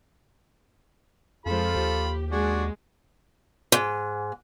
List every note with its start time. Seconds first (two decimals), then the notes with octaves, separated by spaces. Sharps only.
1.46 F2 F3 G#3 F4 A4 B5
1.76 D#2 G4
2.31 G#3 D4 F#4 G#4
3.72 G#2